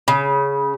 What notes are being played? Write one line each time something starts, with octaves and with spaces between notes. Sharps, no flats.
C#3